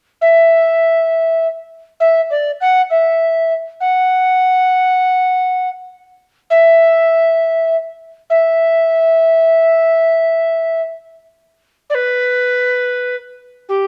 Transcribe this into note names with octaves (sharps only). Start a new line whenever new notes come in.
E5
E5
D5
F#5
E5
F#5
E5
E5
D5
B4
G4